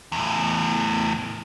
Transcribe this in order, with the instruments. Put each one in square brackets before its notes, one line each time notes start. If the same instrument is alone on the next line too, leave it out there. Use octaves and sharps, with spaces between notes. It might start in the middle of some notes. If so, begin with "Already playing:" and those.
[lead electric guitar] E2 A2